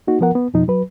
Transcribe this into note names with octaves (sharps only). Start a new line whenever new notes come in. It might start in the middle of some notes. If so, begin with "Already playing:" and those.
A#3 D#4 F#4
F3 B3 A#4 F#5
B3
F2 B2 F3 D#4
F#3 B4